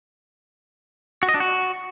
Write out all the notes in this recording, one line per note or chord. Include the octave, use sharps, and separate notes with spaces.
F#4
D#5
D4
F#4